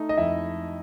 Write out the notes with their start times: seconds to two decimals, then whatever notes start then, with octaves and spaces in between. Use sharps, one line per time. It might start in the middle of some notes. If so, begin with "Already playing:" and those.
Already playing: A3 D#4
0.09 D#5
0.17 F2 E4 E5